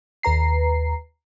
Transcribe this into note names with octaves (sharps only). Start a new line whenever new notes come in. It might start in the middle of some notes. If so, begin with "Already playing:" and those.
D#2 B4 A#5 C7